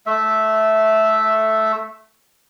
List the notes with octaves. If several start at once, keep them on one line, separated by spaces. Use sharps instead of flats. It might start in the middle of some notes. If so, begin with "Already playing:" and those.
A3 E5